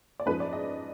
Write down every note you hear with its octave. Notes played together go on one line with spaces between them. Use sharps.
D5
F#2 F3 G#3 D#4 B4
D5
D#5